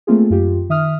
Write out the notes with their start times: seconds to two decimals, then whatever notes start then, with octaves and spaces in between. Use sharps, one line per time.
0.07 A3 A#3 C4 F4 G#4
0.30 F#2 F4 G4
0.69 D#3 E5 D#6 F6